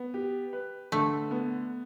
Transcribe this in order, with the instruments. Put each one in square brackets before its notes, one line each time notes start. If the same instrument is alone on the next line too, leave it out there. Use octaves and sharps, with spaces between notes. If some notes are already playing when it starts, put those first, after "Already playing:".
Already playing: [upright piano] B3
G4
B4
[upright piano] D3 [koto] A3
[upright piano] B3